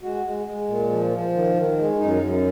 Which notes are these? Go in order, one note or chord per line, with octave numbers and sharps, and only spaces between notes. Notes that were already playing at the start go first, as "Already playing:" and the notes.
G#3 F#4
G#3
G#3
A#2
F3
F3
D#3
D#3
G#3
F#2 D#4
F#2